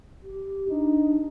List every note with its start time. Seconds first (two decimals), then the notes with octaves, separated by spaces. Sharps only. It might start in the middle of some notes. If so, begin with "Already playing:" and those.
0.23 G4
0.69 D4 D#4